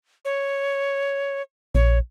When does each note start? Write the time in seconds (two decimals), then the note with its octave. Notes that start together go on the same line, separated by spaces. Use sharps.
0.25 C#5
1.75 A#1 C#5